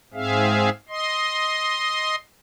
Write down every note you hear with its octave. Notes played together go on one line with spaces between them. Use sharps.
G#2 C4 G#4 E5 F5
D#5 C6